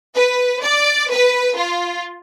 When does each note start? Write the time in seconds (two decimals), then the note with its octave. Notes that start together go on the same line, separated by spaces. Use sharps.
0.14 B4
0.62 D5
1.09 B4
1.56 F4